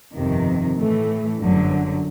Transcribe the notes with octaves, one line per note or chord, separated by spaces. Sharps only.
G1 F2 C3 D#3
A2 E3 A3
G1 F#2 D3 F#3